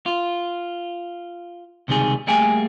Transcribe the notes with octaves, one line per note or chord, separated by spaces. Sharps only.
F4
C#2 C3 D#3 G3 G#4
G3 A3 A#3 G#4 G5 G#5